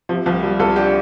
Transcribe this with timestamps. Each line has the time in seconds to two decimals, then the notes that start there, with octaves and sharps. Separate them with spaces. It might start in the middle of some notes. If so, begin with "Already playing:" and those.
0.09 C3 F3
0.26 C2 F3
0.43 C3 G3
0.59 C2 F4 A4
0.76 D4 G4